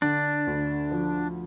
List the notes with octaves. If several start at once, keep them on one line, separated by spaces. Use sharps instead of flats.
D3 D4
D2
F3